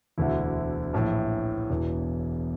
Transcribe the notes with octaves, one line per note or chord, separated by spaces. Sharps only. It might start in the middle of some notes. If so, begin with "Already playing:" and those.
E1 D2 D3 E4
A#1 A2 E3
E1 E2 E3